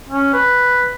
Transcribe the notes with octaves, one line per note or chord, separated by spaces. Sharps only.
C#4
B4